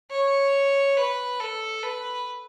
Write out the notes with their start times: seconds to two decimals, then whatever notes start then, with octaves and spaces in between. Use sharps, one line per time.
0.11 C#5
0.97 B4
1.40 A4
1.83 B4